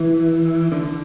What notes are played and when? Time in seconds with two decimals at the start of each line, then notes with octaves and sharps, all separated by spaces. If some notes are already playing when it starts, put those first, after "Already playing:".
Already playing: E3
0.72 D3